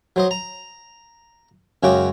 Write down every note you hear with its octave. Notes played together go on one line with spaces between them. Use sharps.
F#3 C5 D#5
A#5
F#2 C#3 G#3 F#4 G5 D6